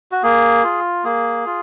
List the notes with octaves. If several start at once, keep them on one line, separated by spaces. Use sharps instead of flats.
F#4
A#3 G#4
F4
A#3 G#4
F4